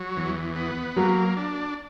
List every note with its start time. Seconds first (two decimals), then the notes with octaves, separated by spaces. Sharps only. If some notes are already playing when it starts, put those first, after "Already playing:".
Already playing: F#3
0.16 E2
0.56 B3
0.97 F#3 A#3
1.37 D4